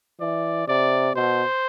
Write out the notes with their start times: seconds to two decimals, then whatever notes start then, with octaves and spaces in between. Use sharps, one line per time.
0.20 E3 D5
0.67 C3 D5
1.15 B2 C5